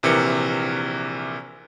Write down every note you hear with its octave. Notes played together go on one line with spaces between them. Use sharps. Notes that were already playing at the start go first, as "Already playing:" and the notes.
A#1 C3 E3 A#4 C#7